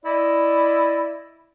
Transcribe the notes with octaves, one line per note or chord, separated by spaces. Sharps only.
E4 D5 D#5